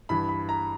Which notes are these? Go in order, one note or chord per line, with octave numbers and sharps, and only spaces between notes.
G2 E3 B5
B5
A#5